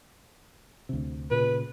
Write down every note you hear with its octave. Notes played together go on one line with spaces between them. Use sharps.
D2 C3
A#2 C#3 B4